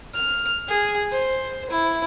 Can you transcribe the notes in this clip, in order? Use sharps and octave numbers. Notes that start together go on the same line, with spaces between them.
F6
G#4
C5
E4